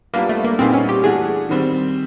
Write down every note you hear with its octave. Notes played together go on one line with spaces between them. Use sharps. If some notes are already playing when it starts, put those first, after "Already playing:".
G3 A#3 B3 D4 F4
A3
A#3
A#2 G3 B3 C4 D#4 G#4
C#4
G4
E3 A3 D4 F#4 G#4
D#3 G3 C4